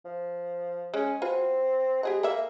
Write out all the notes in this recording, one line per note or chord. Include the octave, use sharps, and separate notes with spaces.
F3
G#3 C#4
C4 F4 F#4 B4
G#3 G4 G#4 F#5
A#3 A4 D5 E5